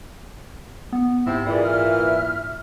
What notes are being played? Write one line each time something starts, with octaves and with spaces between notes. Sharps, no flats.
B3
G#2 C3 E4
A#2 E3 G#4 D5
E5 F6